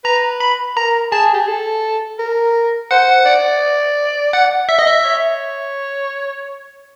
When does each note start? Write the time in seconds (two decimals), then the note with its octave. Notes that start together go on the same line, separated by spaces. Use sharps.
0.04 B4 A#5
0.40 B5
0.76 A#4 A#5
1.12 G#4 A5
1.34 G4
1.40 G#4
1.48 A4
2.19 A#4
2.91 C5 F#5
3.26 D5
4.33 F#5
4.69 E5
4.79 D#5
4.88 E5
5.04 C#5